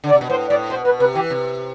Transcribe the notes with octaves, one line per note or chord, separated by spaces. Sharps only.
D3
D5
C3
B2
A2 C5
A2 D5
B2 C5
B2 B4
C3 B4
E3 G4
C3